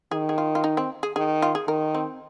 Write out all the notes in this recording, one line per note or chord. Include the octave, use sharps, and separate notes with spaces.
D#3 G#4
G#4
F4
F4
D#4
C4
G#4
D#3 G#4
F4
G#4
D#3 A#4
C4